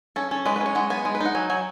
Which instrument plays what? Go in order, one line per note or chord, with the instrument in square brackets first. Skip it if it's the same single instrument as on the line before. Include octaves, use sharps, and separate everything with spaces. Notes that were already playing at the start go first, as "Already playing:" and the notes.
[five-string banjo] C#4 A4
C#4 A4
G#3 B4
B4
C#4 C#5
G#3 F#5
B3 G#5
G#3
B4
D#4 F#5
F#3 G#5
F#3 G#5